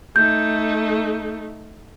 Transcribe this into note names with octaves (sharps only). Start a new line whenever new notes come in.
A3 D#4 G6